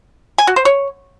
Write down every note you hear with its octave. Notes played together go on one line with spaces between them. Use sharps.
G#5
F#4
C5
C#5